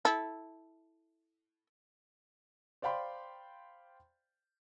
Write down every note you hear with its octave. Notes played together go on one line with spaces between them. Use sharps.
E4 A4
C5 D5 F5 G5 B5 C6